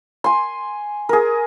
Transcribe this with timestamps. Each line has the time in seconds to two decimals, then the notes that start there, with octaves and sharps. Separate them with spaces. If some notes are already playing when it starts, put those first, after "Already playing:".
0.24 G#5 C6
1.09 G#4 A#4